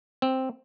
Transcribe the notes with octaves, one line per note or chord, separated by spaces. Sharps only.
C4